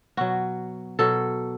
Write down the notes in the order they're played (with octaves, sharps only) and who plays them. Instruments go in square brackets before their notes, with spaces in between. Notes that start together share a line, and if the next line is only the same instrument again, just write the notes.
[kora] B2 F#3 F#4
B2 F#3 A4